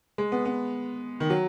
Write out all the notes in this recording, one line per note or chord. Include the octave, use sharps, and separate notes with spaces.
G#3
B3
B3
D#3
F#3